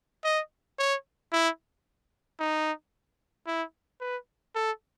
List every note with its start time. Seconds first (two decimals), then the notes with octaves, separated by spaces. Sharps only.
0.24 D#5
0.79 C#5
1.33 E4
2.40 D#4
3.47 E4
4.01 B4
4.55 A4